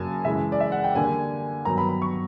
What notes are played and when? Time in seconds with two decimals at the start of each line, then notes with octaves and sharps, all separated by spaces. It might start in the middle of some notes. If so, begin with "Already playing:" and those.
Already playing: F#2 C#3 F#3 A#3 G#5 A5
0.25 C#3 E3 G#3 E5
0.52 D5
0.61 E5
0.72 F#5
0.84 G5
0.95 D3 G3 A#3 D4 G#5
1.65 G2 D#3 F#3 B3 A#5
1.78 B5
1.89 B5
2.02 C#6